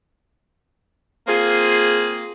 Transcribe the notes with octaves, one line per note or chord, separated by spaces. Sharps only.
A#3 C4 F4 G#4